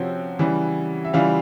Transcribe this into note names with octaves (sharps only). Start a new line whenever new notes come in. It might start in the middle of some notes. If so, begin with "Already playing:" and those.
Already playing: C3 F3 C4 C#4 F#4 C5 C#5 G5
C#3 E3 G3
E5
C#3 E3 G3 F4 F5